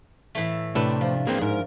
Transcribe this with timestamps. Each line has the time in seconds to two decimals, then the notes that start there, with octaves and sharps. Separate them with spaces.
0.35 A2 E3 A3
0.75 A2 C3 D4 A4 B4
1.01 F3
1.27 A#3 C4 G#4 B4
1.42 G#2 A#4